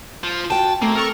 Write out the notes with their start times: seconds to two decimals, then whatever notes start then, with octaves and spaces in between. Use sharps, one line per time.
0.24 F4 C5
0.50 F#4 G5 A5
0.82 A3 A#3 C4
0.95 A4 A#4 C#6